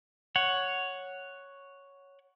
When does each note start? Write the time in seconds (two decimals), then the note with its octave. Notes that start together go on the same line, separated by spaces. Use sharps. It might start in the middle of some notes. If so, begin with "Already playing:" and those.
0.36 C#5 F#5